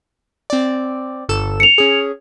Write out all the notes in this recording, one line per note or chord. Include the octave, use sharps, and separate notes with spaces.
C4 D5
G1 A4 E7
C#7 F7
C#4 G#4